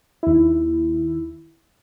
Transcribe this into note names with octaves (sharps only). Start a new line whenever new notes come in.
D#2 E4